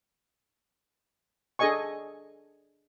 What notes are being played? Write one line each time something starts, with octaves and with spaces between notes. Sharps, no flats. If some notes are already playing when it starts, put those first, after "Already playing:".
D4 G#4 A4 D#5 G#5 C#6